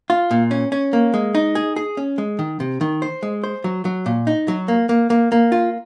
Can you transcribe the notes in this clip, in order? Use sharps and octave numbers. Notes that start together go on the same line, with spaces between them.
F4
A#2
C#4
C#4
A#3
G#3
D#4
G#4
G#4
C#4
G#3
D#3
C3
D#3
C5
G#3
C5
F#3
F#3
A#2
D#4
F#3
A#3
A#3
A#3
A#3
F4